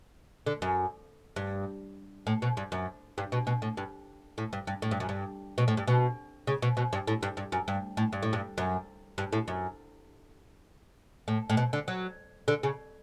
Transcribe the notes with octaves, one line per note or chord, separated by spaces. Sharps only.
D3
F#2
G2
A2
B2
G2
F#2
G2
B2
B2
A2
G2
A2
G2
G2
A2
G2
F#2
G2
B2
A2
G2
B2
C#3
B2
B2
G2
A2
G2
G2
F#2
G2
A2
G2
A2
G2
F#2
G2
A2
F#2
A2
A2
B2
D3
F#3
D3
C#3